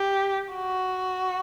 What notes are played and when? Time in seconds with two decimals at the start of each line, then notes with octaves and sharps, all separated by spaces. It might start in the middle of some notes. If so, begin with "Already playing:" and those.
Already playing: G4
0.54 F#4